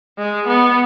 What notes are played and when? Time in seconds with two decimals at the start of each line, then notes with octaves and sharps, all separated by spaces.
0.18 G#3
0.48 B3